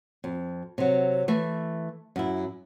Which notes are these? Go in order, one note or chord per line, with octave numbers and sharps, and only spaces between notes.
F2
C3 F#3
E3 A3 E5
F#2 E4